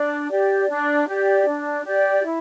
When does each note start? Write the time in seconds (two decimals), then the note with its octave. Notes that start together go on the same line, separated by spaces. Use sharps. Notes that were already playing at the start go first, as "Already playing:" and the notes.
Already playing: D4
0.30 G4 D5
0.69 D4
1.07 G4 D5
1.46 D4
1.85 G4 D5
2.24 E4